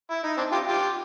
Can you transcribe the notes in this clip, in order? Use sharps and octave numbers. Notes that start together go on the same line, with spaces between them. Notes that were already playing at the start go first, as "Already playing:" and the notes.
E4
D#4
C4 D4
F4 G4
F4 G4